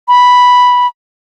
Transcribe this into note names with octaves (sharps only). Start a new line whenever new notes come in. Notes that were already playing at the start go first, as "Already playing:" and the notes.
B5